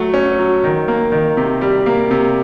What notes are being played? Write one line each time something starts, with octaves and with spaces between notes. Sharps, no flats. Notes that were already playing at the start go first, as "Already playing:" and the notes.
Already playing: F#3 A3
C#4
F#3
D#3
A#3
D#3
C3
G3
A#3
C3